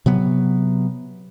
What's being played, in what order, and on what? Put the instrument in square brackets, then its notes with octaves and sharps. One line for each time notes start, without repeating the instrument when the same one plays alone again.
[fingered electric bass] C3 F#3 B3